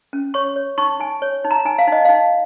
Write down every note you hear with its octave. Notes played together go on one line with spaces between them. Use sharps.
C#4
C#5 C#6
C#5
D#4 C#6
D#4 G#5
C#5
D#4
A#5
D#4 G#5
F5
D#4 D#5
D#4 F5